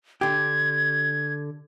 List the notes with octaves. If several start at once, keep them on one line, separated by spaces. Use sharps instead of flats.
D3 G4 G#6